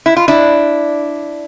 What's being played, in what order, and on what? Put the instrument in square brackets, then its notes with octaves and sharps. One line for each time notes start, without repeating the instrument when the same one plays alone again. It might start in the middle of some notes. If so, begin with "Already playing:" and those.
[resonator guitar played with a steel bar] E4
F4
D4 E4